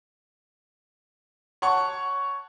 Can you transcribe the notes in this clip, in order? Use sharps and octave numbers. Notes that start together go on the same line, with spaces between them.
C#5 F#5 A5 C#6